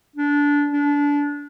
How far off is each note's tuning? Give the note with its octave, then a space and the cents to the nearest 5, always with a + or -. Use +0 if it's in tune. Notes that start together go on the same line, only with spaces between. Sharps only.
D4 -20
D4 -25